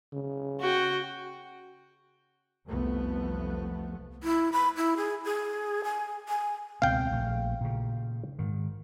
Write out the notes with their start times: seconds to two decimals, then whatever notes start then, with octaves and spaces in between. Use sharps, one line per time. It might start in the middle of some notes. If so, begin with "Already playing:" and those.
0.13 C#3
0.61 F#4 G5
2.67 F1 C2 F3 A3 B3
4.24 E4
4.53 B5
4.77 E4
4.97 G#4
5.25 G#4
5.84 G#5
6.29 G#5
6.82 C#2 B2 C4 F5 G5
7.11 A#1 A3
7.61 A#2 C#3
8.39 G#2 D#3